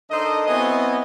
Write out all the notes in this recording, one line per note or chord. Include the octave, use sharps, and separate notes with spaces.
D#3 D4 A4 C5 D#5
F#3 B3 C4 E4 D#5 G#5